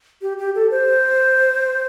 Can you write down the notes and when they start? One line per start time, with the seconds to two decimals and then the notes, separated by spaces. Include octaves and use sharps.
0.22 G4
0.38 G4
0.55 A4
0.71 C5